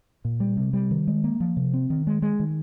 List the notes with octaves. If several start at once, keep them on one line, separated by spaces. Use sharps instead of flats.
A#2
G3
C3
G3
D#3
G#3
A#3
F3
C3
C4
D#3
G#3
G#3
D#3